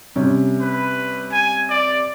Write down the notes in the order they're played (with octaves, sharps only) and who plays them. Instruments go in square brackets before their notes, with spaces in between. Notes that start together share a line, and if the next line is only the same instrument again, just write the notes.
[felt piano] C3 G3 C#4
[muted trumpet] B4
G#5
D5